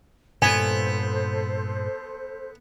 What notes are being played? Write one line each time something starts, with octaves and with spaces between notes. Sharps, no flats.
G2 A#2 B3 A4 C5 G#5